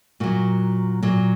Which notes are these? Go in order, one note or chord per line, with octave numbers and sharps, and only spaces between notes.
A#2 F#3 F#4
A#2 F#3